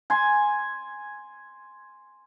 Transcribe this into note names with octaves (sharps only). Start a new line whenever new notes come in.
G#5 C6